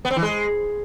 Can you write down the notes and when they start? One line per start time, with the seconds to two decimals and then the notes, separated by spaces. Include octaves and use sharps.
0.05 B3
0.11 C4
0.16 E3
0.22 G#3